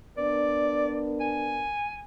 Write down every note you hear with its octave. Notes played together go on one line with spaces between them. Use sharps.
B3 D4 A#4 D5
G#5